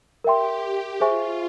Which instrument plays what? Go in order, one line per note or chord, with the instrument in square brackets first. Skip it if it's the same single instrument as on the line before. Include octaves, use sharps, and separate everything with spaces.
[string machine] G4 [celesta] A#4 E5 G5 C6
[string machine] F4 [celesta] G#4 C5 E5 G#5 C#6